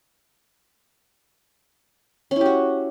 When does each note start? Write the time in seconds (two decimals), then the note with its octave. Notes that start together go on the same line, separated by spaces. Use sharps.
2.31 C#4
2.36 E4
2.41 G4
2.46 F#4